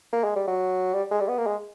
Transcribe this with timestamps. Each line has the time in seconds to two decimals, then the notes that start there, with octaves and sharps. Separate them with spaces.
0.13 A#3
0.24 G#3
0.35 G3
0.47 F#3
0.94 G3
1.11 G#3
1.21 G3
1.28 B3
1.38 A#3
1.47 G#3